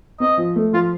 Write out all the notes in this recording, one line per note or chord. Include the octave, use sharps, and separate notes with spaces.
C4 D#5
F3
A3
F3 F4